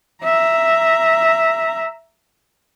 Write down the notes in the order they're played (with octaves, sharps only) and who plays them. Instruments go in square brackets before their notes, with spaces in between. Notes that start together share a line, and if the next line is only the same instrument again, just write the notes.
[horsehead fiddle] E5 A#5